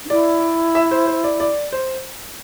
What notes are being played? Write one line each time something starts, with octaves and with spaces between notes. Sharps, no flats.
D4
E4 D5
E5
C5
C5
D5
D5
C5